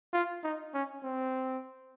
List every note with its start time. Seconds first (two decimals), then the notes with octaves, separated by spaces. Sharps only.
0.13 F4
0.44 D#4
0.74 C#4
1.03 C4